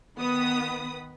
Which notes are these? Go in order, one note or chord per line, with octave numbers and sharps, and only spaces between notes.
D#3 B3 B5 D#6